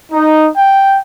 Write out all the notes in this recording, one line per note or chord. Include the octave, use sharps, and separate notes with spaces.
D#4
G5